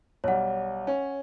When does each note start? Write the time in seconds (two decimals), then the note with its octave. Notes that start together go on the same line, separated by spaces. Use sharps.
0.24 B1 G3 C#5 F#5
0.87 C#4